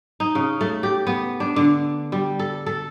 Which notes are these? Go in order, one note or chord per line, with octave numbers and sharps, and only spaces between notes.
D#4
C#3
A3
G4
B3
D4
D3
G3
A4
A4